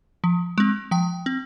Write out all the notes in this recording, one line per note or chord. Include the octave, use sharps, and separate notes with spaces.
F3
G#3 C4
F3 G5
C4